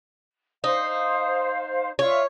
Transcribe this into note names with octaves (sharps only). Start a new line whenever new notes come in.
D#4 C5 F5
F4 C#5 E5